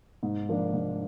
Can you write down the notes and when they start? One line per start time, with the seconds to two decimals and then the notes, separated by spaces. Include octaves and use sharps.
0.23 G#2
0.49 F3 A#3 D4
0.73 G#2